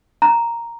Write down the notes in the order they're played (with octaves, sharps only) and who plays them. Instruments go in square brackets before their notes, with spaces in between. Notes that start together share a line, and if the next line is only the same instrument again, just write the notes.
[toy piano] A#5